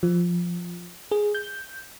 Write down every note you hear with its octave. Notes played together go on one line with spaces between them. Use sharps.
F3
G#4
G6